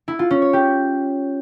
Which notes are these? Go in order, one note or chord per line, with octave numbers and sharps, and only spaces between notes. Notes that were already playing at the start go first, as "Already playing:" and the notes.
E4
F4
C#4
C#5
G4